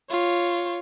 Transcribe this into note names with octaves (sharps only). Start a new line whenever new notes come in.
F4 C#5